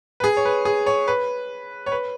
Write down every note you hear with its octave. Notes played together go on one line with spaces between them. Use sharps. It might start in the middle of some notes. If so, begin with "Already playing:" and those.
B4
G#4
C#5
B4
G#4
C#5
B4
C#5
B4